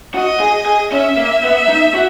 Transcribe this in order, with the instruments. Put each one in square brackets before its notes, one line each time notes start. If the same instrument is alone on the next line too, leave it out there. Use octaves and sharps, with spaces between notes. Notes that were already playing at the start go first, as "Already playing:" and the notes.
[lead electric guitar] F#4 [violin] D#5
[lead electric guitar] G#4
G#4
[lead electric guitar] C#4 [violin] E5
[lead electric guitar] A#3
B3
D#4
F#4